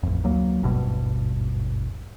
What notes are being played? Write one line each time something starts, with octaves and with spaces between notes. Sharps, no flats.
A1 F2
D2 F#3 A#3
D#1 G#1 G2 B2